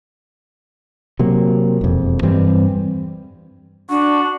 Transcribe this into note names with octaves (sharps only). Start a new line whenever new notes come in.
C3 F#3 A#3
E1 F2
G2 E3 G3 C4
D4 F#4